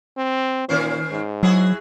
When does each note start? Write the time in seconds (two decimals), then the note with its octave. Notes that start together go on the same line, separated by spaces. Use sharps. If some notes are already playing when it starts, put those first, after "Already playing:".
0.17 C4
0.69 A#2 D#3 C#4 C5
1.11 G#2
1.43 F#3 E4 F#4 G#4